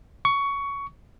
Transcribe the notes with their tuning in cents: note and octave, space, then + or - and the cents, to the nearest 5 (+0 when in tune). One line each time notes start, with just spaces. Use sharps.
C#6 +15